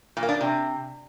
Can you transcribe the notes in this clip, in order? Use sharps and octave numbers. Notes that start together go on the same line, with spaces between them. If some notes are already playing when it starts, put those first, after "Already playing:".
A#2
A#3
D4
A#2
C3